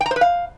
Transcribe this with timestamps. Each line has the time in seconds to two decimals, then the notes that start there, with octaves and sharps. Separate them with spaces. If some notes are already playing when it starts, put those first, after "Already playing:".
0.01 G5
0.06 A#5
0.11 C5
0.16 B4
0.21 F5